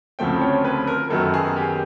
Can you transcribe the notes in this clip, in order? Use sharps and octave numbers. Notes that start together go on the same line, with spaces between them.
D2 C#3 F3 A3 C4 G5
C#5
B4
A#4
F#2 D#3 F#3 B3 A4
G#4
G4